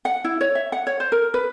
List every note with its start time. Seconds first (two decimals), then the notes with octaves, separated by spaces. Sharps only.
0.05 F#5
0.24 E4
0.41 C#5
0.55 E5
0.72 F#5
0.87 C#5
1.00 C5
1.12 A#4
1.34 B4